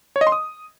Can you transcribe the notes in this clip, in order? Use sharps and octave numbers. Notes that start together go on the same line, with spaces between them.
C#5
D#5
C6
D#6